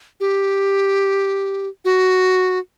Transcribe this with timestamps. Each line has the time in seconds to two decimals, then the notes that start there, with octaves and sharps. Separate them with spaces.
0.20 G4
1.85 F#4